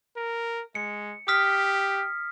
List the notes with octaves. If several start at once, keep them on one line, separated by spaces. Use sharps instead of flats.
A#4
G#3 C#7
G4 D#6 F6 B6